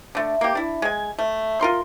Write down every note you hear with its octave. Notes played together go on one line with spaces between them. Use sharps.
D3 A3
A#3 G4
D4 E4
G#3 G#5
A3
F4 A#4 C6